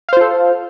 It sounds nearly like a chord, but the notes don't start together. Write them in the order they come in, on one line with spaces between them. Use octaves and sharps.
F5 C5 F4 A4